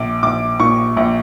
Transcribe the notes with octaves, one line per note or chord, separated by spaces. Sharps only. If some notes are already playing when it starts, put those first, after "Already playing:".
Already playing: A#1 D6
A#1 D6
A#2 C#6
A#1